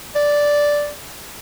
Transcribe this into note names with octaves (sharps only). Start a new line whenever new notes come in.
D5